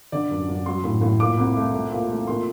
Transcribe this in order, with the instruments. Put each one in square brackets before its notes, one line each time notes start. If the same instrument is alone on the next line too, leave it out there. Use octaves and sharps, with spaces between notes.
[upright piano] D3 D5
F#2
F#2
F#3 C6
A2
A2
A#2 D6
C2
A3
A3
A#2
A3
A#2 C6